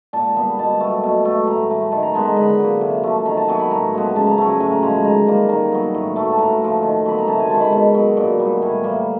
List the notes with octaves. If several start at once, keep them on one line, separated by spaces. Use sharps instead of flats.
A#2 A5
G3 B3
B2 A5
F#3 A3
B2
F#3 A3
A2 A#5
E3 A3
D#3 A5
A#5
G#3 B3 A5
A#5
D3 B5
F#3 A#3
C3
F3 A3
D#3 A#5
A5
F#3 B3 G#5
B5
A2 A#5
F3 G#3 B3
C#3 A5
A#5
F#3 A3 A#5
G#5
A2 G#5
A#5
F3 G#3 A#5
B5
D#3 A#5
G3 A#3
D#3 A#5
F#3 B3
A2
F#3 A3
A5
A2 A#5
F3 A3
D#3
F#3 B3 B5
A#5
C3 A5
G#5
D#3 G#3 A5
B5
B2
F#3 B3
A#2
G3 B3
A2 G#5
E3 G3 A#3